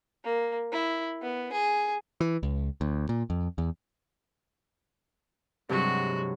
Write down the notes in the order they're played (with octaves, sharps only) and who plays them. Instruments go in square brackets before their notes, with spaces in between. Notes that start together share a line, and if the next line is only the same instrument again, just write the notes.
[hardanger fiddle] A#3
E4
B3
G#4
[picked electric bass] E3
C#2
D2
A#2
F2
E2
[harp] G2 C3 F#3 [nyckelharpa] G#3 F#4